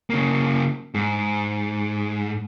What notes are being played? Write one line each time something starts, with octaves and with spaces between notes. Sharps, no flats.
C#3 A#3
G#2